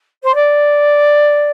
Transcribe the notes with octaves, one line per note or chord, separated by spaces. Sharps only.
C5
D5